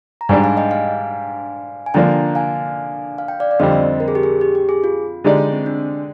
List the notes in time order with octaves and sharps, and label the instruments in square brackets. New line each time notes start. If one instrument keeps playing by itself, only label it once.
[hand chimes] A#5
[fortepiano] G#2 G3 D4 G4 [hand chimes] F5 G#5
[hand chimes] F5 G#5
D#5 G5
F5 G#5
G#5
[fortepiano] D3 F3 A#3 D4 [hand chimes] G5 A#5
[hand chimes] F5 G#5
F5
G5
D5 F5
D5
[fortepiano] F2 D3 G3 C4 [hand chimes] C5 D#5
[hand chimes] A#4
G#4
G4
G#4
G4
G4
G#4
F4
[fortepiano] D3 G#3 D#4 G4 D5
[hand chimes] C4
D4